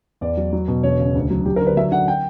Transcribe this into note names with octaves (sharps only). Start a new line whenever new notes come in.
E2 D5
F#3
F#3
B2
E1 C#5
C#3
D2
F#3
F#3 G4
A#4
D3
B4
F#3 E5
D3 F#5
G5